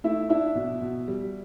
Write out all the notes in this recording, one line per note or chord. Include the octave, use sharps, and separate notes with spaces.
A3 E4 E5
D4 E4 E5
B2
B2
G3